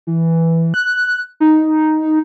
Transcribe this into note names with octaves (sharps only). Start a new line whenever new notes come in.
E3
F#6
D#4